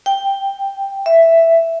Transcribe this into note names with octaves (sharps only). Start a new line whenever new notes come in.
G5
E5